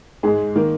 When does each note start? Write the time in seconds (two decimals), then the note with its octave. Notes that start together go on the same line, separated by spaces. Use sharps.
0.23 G#2 G#3 G#4
0.55 D#3 A#3 A#4